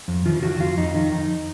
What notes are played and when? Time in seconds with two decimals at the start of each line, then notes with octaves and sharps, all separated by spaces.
0.08 F2
0.26 D#3 F4
0.43 D#3 F#4
0.60 F2 F4
0.77 F2 D#4
0.94 D#3 D#4
1.12 F2 D#4